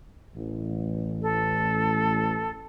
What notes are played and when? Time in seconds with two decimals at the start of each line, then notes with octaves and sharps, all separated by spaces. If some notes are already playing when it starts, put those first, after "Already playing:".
0.35 A1
1.22 A4